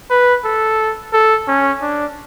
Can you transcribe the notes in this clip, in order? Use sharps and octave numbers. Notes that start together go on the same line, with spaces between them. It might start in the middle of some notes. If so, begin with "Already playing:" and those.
B4
A4
A4
C#4
D4